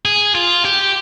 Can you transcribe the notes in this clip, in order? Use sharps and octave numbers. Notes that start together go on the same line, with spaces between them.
G#4
F4
G4